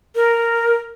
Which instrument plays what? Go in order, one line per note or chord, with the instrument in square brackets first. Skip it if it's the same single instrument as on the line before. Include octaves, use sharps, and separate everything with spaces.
[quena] A#4